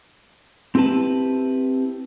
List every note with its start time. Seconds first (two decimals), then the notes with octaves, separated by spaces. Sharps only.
0.75 C4 E4 G4 B4 A5